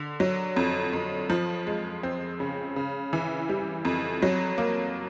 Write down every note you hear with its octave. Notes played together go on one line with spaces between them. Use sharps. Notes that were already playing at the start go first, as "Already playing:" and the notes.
Already playing: D3
F#3
F2
F2
F3
G#3
C4
C#3
C#3
E3
G3
F2
F#3
A#3